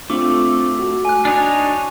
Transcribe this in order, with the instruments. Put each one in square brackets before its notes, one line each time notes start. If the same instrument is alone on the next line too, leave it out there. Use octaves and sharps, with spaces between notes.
[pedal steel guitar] A3 [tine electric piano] C4 D4 F4 [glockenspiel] D6
[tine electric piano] F#4
[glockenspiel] G#5 F#6
[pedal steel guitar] D4 D#4 C#5 [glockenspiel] G#5